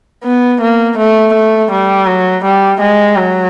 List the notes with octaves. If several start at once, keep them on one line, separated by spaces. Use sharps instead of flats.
B3
A#3
A3
A3
G3
F#3
G3
G#3
F#3